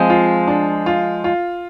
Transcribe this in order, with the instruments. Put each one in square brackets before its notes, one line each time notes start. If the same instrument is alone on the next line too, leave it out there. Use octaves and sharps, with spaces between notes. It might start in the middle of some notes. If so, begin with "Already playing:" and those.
Already playing: [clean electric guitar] F3 G#3 [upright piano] C4
[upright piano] F4
D4
F4
F4